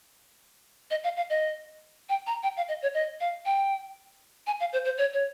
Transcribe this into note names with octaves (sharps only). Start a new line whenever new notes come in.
D#5
F5
F5
D#5
G5
A#5
G5
F5
D#5
C#5
D#5
F5
G5
G#5
F5
C5
C5
C#5
C#5